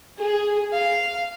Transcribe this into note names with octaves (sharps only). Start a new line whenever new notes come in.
G#4
F5